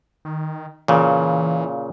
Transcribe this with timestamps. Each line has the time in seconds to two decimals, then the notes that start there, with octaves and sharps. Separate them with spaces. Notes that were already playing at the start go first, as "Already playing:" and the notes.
0.25 D#3
0.88 A#2 C#3 E3